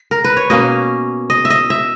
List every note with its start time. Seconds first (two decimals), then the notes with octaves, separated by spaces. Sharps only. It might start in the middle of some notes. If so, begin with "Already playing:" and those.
Already playing: G#4
0.11 A#4
0.24 B4
0.37 C#5
0.50 B2 A#3 C#4 D#5
1.30 D#5
1.45 E5
1.50 D#5
1.70 E5